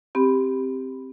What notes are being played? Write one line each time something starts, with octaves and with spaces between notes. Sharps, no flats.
C4 G4 B5